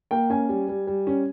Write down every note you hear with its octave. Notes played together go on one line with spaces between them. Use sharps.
A#3 G5
C#4 G#5
G3
G3
G3
C#4